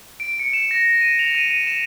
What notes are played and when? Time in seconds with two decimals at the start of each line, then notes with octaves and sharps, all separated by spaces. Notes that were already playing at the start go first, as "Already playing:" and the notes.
0.20 D7
0.40 C#7
0.53 E7
0.71 A#6
1.01 D#7
1.19 F7
1.35 D#7
1.51 D#7
1.67 E7